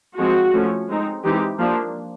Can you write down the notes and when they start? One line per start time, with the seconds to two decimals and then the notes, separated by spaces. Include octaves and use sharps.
0.17 F3 G#3 C4 F#4
0.53 F3 A3 C#4
0.89 G#3 C4 D#4
1.24 E3 G#3 C4 D#4 G4
1.59 F3 A#3 D4